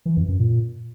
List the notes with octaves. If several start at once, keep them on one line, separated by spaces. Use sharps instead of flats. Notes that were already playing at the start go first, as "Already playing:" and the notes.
E3
F2
F#2
A#2